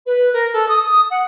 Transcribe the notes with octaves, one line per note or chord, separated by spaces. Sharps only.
B4
A#4
A4
D#6
D#6
F#5